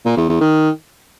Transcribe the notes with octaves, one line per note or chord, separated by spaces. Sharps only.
A#2
E2
E2
D#3